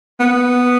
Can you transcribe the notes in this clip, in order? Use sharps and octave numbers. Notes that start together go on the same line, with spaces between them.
B3